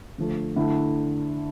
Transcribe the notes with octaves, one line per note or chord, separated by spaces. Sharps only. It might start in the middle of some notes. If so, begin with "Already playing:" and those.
D3 F3 A3
D3 A3 E4